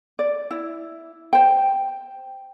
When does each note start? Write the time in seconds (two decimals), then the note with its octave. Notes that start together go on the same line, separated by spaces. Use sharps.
0.19 D5
0.51 E4
1.33 C5 G5